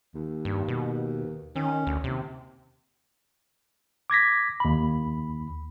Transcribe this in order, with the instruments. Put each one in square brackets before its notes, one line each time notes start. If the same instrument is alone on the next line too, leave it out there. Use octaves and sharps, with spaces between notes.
[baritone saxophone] D#2
[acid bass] G2
B2
[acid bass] D#3 [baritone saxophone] C#4
[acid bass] D2
[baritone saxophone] D#2 [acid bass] C3
[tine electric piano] D6 G#6 A#6 B6
D#2 B5